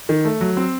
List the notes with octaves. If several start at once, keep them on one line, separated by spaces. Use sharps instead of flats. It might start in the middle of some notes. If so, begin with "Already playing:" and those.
D#3
A3
F#3
C4